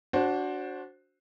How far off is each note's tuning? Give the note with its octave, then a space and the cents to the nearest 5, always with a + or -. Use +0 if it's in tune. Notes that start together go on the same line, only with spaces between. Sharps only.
D4 -15 F#4 +0 C5 +15